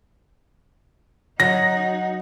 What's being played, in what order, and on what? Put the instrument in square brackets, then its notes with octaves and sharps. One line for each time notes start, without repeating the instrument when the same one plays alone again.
[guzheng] F#3 [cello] D#4 F#5 [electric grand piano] A#6